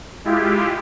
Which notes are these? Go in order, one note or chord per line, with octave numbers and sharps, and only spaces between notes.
G#3 E4 F4 G4